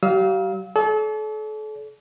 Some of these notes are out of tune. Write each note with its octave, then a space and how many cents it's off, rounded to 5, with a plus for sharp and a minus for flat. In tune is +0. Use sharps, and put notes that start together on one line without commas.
G3 -45 F5 +0 E6 -40
A4 -40 D5 -45